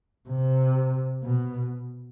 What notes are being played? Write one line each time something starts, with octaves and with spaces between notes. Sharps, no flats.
C3
B2